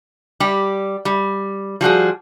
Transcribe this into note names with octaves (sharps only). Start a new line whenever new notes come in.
G3 G4
G3
F3 G3 F#4 G#4